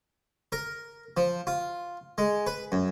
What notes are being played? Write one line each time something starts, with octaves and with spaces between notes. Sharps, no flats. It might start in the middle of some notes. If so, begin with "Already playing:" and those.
A#4
F3
F4
G#3
B4
F#2